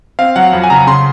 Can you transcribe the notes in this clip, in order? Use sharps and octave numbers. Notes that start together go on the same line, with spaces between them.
C4 F5
F#3 F#5
F2
G#5
C#3 A#5
C#3 C6